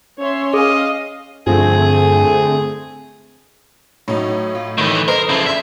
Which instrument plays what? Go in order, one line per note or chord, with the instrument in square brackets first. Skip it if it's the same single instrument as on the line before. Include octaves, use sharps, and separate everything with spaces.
[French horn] C#4 [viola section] C#5 E5 C6
[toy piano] G#4 G#5 [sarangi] D#5 [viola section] F5
[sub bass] G2 [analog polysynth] D3 A3 C4 [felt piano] F3 [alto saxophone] G#4
[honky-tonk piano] A2 D#4 [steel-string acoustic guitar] F#3
[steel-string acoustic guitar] F4
[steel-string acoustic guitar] F#2 A3 B4 [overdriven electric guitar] D#3 E3
[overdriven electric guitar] A#4 [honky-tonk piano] C5 D#5 C7
[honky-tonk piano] C#3 [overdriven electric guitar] F3 E4
[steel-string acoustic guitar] D4 [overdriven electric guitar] E5 [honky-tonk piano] C6 B6